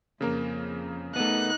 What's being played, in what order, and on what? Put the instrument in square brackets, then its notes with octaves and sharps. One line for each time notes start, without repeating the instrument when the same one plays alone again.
[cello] F2 [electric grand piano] C#3 A#3 A#4
[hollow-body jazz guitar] A3 B3 [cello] D#4 [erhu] F#6